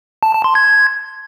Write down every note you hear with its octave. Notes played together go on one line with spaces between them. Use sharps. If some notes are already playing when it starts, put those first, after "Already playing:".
A5
A5
C6
G#6